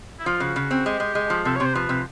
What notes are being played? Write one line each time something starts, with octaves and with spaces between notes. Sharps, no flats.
E4
F3 F4
C#3 F#4
C#3
C4
G#3 G4
G#3
G#3
F3
C3 A4
C3 C#5
C5
F3 B4
C3